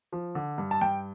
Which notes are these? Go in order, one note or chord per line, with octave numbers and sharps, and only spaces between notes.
F3
D3
G2
A5
G2 G5